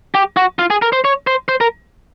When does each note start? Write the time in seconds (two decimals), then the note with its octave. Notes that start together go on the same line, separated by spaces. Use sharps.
0.15 G4
0.37 F#4
0.59 F4
0.70 G#4
0.82 A#4
0.93 C5
1.05 C#5
1.27 C5
1.49 C5
1.61 A#4